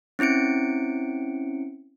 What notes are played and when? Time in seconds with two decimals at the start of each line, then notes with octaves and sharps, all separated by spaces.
0.19 C4 C#4 E4 C#7 D7